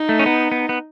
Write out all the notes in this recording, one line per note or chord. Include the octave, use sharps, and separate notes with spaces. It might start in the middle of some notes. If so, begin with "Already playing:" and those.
Already playing: D#4
A3
C#4
B3
B3
B3